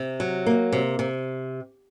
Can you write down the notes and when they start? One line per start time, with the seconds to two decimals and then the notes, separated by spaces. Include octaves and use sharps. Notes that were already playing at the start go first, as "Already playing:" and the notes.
Already playing: C3
0.20 F#3
0.46 A#3
0.72 C3
0.99 C3